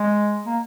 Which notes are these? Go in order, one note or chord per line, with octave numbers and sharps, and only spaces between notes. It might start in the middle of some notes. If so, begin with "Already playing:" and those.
Already playing: G#3
A#3